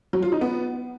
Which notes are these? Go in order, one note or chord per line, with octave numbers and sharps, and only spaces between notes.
F#3
F4
D#4
B3